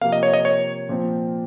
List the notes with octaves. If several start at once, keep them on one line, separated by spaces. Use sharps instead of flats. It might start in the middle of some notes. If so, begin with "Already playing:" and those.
C3 F3 A#3 F5
D#5
C#5
D#5
C#5
A#2 F3 C4